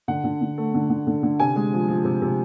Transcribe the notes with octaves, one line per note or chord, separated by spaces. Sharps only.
D3 F#5
D3
D3
A3
D3
D3
D3
D3
C3 G#5
G#3
F3
F3
C3
C3